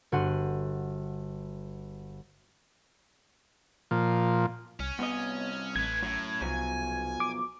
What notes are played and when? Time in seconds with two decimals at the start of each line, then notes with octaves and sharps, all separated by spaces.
0.12 G1 F#4 F#5 C6 D#7
3.91 A#2 F3
4.80 C2 C#4
4.99 C2 B3 D#5
5.76 A1 A3 B4 G#6
6.02 F#2 A2
6.42 C2 B2 F3 F#3 G#5
7.20 D6